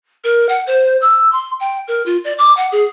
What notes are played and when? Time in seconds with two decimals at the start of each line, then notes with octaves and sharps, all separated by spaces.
0.24 A#4
0.49 F#5
0.67 C5
1.02 E6
1.33 C6
1.60 G5
1.88 A#4
2.06 F4
2.24 D5
2.38 D6
2.57 F#5
2.72 G#4